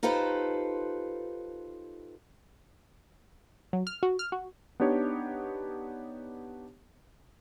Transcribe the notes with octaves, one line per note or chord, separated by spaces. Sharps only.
D#4 F4 G4 A4 B4 C5
F#3
F6
F#4
F6
F#4
B3 D4 D#4 G4 C#5